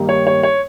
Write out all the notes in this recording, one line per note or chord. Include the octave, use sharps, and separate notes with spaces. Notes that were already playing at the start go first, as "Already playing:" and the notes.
Already playing: G2 D#3 G3 A#3 D#4
C#5
C#5
C#5